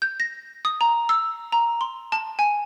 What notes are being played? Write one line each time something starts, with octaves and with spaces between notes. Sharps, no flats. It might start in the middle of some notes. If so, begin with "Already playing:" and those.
G6
A#6
D#6
A#5
E6
A#5
C6
A5
G#5